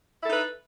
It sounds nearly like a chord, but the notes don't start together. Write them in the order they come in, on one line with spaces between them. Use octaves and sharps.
E4 A4 D#4 B4